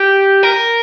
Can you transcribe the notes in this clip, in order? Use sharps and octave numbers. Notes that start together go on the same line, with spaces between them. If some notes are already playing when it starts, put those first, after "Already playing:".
Already playing: G4
A#4